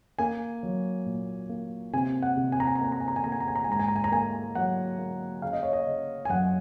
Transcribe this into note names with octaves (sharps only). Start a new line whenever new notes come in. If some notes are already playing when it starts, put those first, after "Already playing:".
A#3 G#5
F#3
A#2
A#3
C3 G#5
F#5
C3
G#5
A#5
G#5
A#5
A#3 G#5
A#5
G#5
A#5
G#5
A#3 A#5
G#5
A#5
G#5
A#5
G#5
G#2 A#5
G#5
A#5
G#5
A#5
A#3 G#5
F#3 F#5
A#3
C#3 F5
D#5
C#5
D#5
C#3
G#5
F#2 F#5